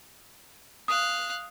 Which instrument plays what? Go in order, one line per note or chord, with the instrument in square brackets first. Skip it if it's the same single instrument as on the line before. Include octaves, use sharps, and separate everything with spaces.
[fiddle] F5 F#6 [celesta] D#6